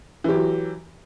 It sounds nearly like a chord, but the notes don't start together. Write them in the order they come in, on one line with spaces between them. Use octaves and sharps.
E3 G4 F#3